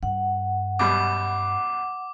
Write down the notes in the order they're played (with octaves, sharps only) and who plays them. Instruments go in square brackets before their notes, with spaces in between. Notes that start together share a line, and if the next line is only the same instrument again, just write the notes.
[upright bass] G2 [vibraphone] F#5
[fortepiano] F#2 B2 G3 [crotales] D6